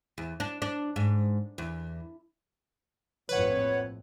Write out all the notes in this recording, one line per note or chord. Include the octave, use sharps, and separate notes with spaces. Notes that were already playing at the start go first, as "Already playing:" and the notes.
E2
D4
D4
G#2
E2
A#1 F2 A2 B4 C#5 F#5